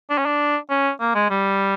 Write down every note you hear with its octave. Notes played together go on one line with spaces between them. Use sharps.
D4
C#4
D4
C#4
A#3
G#3
G3